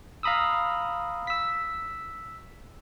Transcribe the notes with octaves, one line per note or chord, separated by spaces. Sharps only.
F5 A#5 B5 D#6 E6
E6 B6